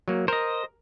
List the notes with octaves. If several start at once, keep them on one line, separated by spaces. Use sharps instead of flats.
F#3 A#3
A#4 C5 D#5